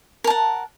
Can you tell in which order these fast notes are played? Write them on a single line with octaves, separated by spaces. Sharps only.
A#4 A5 F#5